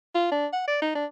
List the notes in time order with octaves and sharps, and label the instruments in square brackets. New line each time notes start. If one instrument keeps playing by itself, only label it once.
[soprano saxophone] F4
D4
F#5
D5
D#4
D4